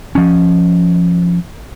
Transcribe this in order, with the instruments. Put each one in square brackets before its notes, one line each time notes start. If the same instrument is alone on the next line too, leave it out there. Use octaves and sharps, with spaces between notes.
[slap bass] F3 C#4